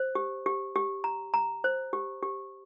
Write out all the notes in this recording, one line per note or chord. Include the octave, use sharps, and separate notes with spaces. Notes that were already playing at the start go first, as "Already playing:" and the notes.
Already playing: C5
G4
G4
G4
A#5
A#5
C5
G4
G4